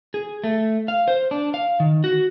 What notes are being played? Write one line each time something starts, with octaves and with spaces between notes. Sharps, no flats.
G#4
A3
F5
C5
D4
F5
D#3
F#4